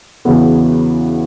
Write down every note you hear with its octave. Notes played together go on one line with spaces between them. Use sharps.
E2 C#3 E3 B3 F#4